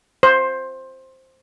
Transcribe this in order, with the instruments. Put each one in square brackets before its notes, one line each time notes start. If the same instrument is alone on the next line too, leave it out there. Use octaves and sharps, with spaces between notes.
[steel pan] C5